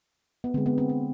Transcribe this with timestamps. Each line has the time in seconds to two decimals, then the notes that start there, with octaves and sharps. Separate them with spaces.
0.44 B3
0.54 D3 C4
0.57 G#3
0.66 B3
0.78 C4
0.89 C4